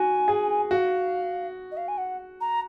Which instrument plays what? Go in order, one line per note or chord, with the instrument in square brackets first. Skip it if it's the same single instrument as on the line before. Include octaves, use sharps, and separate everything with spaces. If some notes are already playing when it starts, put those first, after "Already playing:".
Already playing: [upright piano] F#4 [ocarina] G#5
[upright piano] G#4
[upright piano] F#4 [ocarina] F5
[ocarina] D#5
F5
G#5
F#5
A#5